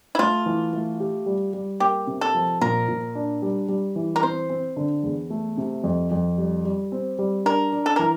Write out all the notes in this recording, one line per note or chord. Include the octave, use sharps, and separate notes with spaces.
E4
A3 F4
E3
A3
G4
G3
G3
A#3 G4
C3
A4
F3
A#2 A#4
A#2
D4
G3
G3
E3
A#4
C4 C5
C4
D3
E2
A3
C3
F2
F2
G3
G3
C4
G3
D4 A#4
D4
A4
E3 A#4